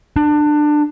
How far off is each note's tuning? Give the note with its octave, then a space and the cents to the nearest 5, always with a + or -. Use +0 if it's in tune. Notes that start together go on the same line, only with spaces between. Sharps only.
D4 +20